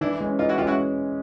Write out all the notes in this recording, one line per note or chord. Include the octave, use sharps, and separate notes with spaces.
E3 D4 E4
G#3 C#4
E3 D#4 F4
E4 F#4
G#3 C#4 F4 G4
E4 F#4